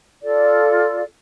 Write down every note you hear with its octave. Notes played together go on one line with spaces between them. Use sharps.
F4 A4 D5